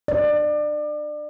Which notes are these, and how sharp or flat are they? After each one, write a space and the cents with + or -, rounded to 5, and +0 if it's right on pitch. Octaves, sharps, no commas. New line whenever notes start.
D5 +30